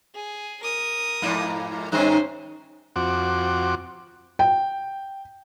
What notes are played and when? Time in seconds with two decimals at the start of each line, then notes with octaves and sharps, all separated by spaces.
0.15 G#4
0.62 A#4 D#6
1.22 F2 G#2 A#3
1.92 G2 D#3 C#4 C5
2.96 F2 C4 F#4 D6
4.39 G5